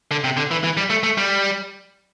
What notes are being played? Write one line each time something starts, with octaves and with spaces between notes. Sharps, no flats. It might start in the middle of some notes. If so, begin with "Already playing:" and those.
D3
C3
D3
E3
E3
G3
A3
A3
G3